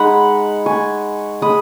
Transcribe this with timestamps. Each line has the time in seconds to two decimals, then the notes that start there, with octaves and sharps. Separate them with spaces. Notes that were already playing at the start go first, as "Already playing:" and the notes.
Already playing: G#3 D#4 F#5 B5
0.66 G#5 C#6
1.42 G#3 B5 D#6